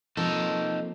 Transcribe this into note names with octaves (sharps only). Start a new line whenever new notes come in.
F3 A#3 C4 D#4 A4